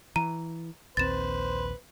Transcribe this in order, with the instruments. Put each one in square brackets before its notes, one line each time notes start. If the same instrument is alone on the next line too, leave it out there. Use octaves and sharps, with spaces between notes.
[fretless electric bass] E3 [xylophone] A#5 D#7
[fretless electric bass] A#1 D#2 C4 [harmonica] B4 C5 [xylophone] A6 E7